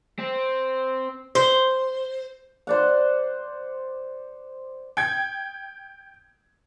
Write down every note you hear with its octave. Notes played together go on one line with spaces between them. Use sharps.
C4
C5
C5 D5 F#5
G5 G#6